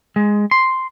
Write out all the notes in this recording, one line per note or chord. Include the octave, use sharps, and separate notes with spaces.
G#3
C6